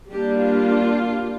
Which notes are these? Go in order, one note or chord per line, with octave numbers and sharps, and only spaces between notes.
G3 A#3 D4 G4
F4